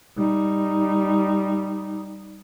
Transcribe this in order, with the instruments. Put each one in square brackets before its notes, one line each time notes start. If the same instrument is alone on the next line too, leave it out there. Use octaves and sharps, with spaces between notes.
[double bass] G3 D#4